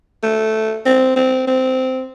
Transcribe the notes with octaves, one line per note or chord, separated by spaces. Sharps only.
A3
C4
C4
C4